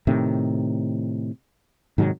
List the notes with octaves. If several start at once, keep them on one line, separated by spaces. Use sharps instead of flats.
A2 C3 D#3
G#2 C3 D#3 F#3